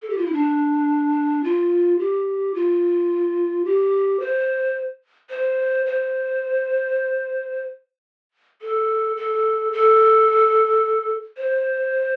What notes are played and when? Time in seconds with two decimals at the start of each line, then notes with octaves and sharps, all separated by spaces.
0.02 A4
0.10 G4
0.18 F4
0.26 E4
0.33 D4
1.44 F4
1.99 G4
2.55 F4
3.65 G4
4.20 C5
5.30 C5
5.86 C5
8.62 A4
9.17 A4
9.73 A4
11.37 C5